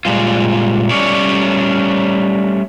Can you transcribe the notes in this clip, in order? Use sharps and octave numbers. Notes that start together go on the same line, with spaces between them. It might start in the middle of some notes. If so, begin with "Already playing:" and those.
A#2 G3 G#3 F4
G3 A3 C#4 C#5 D5